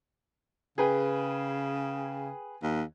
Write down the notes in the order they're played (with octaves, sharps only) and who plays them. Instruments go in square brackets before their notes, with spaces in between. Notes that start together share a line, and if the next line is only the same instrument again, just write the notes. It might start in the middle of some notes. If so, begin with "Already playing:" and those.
[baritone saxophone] C#3 [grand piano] G#4 B4 G5
[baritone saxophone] D#2